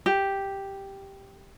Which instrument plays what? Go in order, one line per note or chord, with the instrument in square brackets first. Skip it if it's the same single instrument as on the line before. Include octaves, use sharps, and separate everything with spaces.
[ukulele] G4